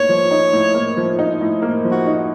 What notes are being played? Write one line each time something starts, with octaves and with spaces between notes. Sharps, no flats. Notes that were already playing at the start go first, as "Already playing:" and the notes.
Already playing: A2 A#3 D#4 C#5
F3
D#4
A2
A#3
F3
D#4
A2
A#3
F3
F#4
D#4